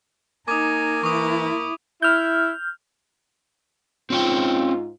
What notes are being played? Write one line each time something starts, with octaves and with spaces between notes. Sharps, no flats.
A#3 D#4 G#5 D6 D#6
E3 E4 C#6 D#6
E4 F6 G6
G#2 C4 C#4 F4 G5